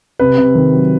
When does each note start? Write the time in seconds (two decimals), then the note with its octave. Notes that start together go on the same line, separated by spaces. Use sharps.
0.19 C3 B4
0.38 C3
0.55 D#3
0.73 F#3